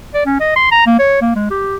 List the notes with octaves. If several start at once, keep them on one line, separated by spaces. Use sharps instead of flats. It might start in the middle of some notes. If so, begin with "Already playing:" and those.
D5
C#4
D#5
C6
A#5
A#3
C#5
A#3
G#3
G4